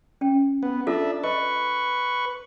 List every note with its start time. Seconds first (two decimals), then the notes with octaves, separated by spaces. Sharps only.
0.21 C#4 G5
0.63 B3
0.87 D4 F4 A4 E5 A5
1.24 B4 D#5 C#6